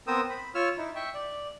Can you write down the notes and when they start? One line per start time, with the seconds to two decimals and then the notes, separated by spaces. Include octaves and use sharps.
0.07 B3 C4 A#4 C5 D#6 E6
0.30 B5
0.55 F4 C#5 E6 F6
0.78 D#4 E4
0.96 E5 G5 C#6
1.14 D5